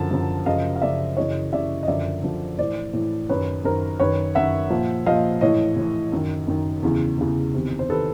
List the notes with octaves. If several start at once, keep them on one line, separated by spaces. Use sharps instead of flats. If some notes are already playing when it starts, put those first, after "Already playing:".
Already playing: F#2 D3 F3 A5
F#2 D3 F3
F#2 C#3 F3 D#5 F5
F5
F#2 C#3 F3 D5 E5
F#2 C#3 E3 C#5 D#5
F#2 C#3 E3 D5 E5
D#5
F#2 D3 F3 D5 E5
F#2 D3 F3
A2 E3 C5 D5
A2 E3
F#2 D#3 B4 C#5
F#2 D#3 A#4 C5
F#2 D#3 B4 C#5
F#2 D#3 E5 F#5
A#2 F3
A#2 F3 D#5 F5
A2 E3 C#5 D#5
A2 E3
F#2 D#3
F#2 D#3
E2 C#3 E3
E2 C#3 E3
E2 C3 D#3
C5
C3 D#3 A4 B4